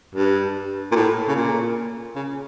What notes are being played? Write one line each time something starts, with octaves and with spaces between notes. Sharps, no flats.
G2
A#2
A2
C#3
A#2
C#3